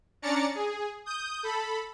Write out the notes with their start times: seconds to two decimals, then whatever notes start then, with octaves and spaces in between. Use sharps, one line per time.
0.22 C#4 D4 D5 A#5 A6 C#7
0.55 G#4
1.06 D#6 G6
1.43 A4 B5